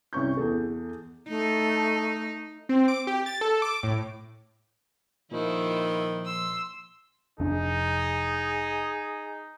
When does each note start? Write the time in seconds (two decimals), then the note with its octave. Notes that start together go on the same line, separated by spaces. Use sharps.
0.13 C2 C#4 C#6 G6
0.37 E2 G#4 A4
1.29 A3 D#4
2.69 C4
2.88 D6
3.07 G4
3.26 A6
3.41 A4
3.62 D6
3.83 A2
5.31 A#2 D#3 F3 E4 F4
6.25 C6 E6
7.40 F1 D4 D#4 G#4